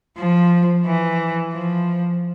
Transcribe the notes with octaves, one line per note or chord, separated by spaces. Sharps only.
F3
E3
F3